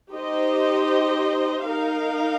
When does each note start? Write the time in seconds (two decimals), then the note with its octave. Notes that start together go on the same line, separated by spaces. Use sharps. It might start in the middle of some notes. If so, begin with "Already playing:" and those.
0.14 D#4 G4 C5 D#5
1.65 D#4 A#4 F5